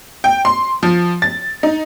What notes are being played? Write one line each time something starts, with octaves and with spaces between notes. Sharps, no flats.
G5
C6
F3
A6
D#4